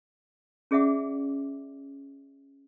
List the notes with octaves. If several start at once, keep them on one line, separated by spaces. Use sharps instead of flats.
C#4 G#4 D5 E5 F#5 D6